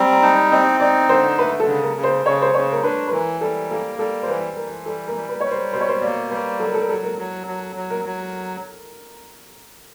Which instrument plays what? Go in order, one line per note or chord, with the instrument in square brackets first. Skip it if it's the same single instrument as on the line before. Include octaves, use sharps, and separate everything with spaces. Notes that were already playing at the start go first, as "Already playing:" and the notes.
Already playing: [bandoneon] G3 C4 [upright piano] A#5
[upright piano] A#5
[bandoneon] D#4 [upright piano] A5
[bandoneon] C4 [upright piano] D#5
[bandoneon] D#4 [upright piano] D5
[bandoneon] D3 [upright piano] C5
[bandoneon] A3 [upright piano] B4
[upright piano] A4
[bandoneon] C#3
[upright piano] A#4
[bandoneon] C#3
[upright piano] C5
[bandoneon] C#3 [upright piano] C#5
[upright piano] C5
[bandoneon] C#3 [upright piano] C#5
[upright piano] A#4
[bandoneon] D4 [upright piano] B4
[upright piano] B4
[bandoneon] E3 [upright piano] A#4
[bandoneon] G3 [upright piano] A4
[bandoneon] A#3 [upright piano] A4
[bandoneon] G3 [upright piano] A4
[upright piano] C5
[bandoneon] E3 [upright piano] B4
[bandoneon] E3 [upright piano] A#4
[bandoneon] G3 [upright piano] A4
[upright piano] A#4
[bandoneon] G3
[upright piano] B4
[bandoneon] G3 [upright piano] C#5
[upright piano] C5
[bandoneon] B2 [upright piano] C5
[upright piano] C#5
C5
[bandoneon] A#3 [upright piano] D5
[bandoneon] G3 [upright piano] B4
[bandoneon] F#3 [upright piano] A4
[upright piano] A#4
A4
A#4
[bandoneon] F#3 [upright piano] A4
[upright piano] A#4
[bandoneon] F#3
F#3
F#3
[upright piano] A#4
[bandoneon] F#3